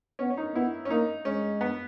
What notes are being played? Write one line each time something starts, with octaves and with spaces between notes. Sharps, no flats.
B3 C#4
C#4
D#4
B3 E4
C#4
A#3 D#4
G#3 C#4
B3